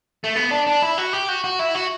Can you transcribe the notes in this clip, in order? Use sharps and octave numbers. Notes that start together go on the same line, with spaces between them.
A3
B3
D4
D4
E4
F#4
G4
F#4
F#4
E4
F#4